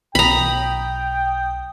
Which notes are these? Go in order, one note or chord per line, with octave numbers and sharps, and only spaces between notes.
B1 G5 A#5 B5 D#6